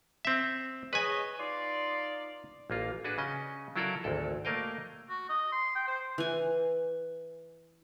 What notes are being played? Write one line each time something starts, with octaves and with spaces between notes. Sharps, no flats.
C4 E5
G#4 B4 C#5 D#5 G#5
D#4 F4 D5
A1 A#3 F4
D4 F#4 G#4 B4
C#3 C#4 D#5
F#3 E4 F4 A4 A#4 D5
G#1 D2 A4
A3 A#3 A#4 D#5 F5 G5
F#4
D#5
C6
G5
C5
E3 G#5